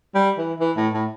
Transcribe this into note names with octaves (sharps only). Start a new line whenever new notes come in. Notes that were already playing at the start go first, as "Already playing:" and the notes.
G3
E3
E3
A2
A2